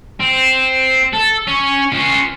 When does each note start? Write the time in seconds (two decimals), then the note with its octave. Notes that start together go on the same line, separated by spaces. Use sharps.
0.20 C4
1.13 A4
1.48 C#4
1.92 C#4 F4